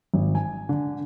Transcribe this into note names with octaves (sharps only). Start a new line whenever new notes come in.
G#1
G#5
D3